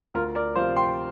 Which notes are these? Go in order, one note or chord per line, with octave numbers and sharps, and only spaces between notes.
D2 F4 A#4
A#4 D5
C3 F3 C5 F5
G5 C6